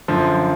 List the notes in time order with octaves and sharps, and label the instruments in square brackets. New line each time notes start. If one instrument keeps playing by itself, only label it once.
[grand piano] F#2 D3 F3